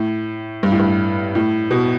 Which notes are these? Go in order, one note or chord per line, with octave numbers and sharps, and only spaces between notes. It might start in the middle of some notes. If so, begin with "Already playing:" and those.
Already playing: A2
G2
A2
G2
A2
B2